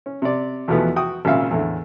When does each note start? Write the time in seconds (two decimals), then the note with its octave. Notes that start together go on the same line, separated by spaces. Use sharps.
0.06 C#4
0.22 C3 D5
0.68 E2 B2 E3 F3 A3 B3
0.96 F#4 G5 D#6
1.25 G#1 A#2 C#3 E5 F5
1.51 E2 A2 D3